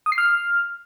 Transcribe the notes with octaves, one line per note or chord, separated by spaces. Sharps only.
D#6
C7
F6